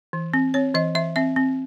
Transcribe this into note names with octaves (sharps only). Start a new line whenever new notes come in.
E3
C4
C4 C#5
E3 D#5
E3 E5
C4 E5
C4